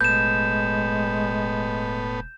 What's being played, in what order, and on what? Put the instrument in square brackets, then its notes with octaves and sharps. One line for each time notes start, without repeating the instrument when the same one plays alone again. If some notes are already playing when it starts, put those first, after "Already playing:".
[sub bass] E1 [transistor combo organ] A2 B3 [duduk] G#3 [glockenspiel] G6 E7